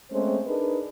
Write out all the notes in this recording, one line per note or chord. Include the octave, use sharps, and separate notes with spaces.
G#3 A3 C4 C#4 C5
D4 D#4 G#4 A#4 B4